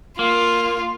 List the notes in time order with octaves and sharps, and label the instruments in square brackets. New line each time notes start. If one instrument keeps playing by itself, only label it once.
[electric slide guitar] A#3 [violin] F4